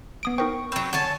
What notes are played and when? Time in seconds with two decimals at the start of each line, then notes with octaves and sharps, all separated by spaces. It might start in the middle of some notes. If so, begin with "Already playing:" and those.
0.23 B3 D#6 D7
0.38 D#4 A#4 C5 G5 C#6
0.72 F#3 C4 B5 E6
0.93 D3 C#5 F#5 G#5 A5